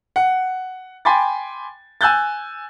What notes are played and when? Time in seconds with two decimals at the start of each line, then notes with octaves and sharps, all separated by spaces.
0.16 F#5
1.05 G5 G#5 B5 C6 D6 A6
2.01 G#5 E6 F#6 G6 A6